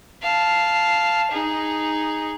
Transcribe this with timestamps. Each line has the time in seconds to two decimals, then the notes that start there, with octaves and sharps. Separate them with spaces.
0.22 F5 A5
1.31 D#4 G#4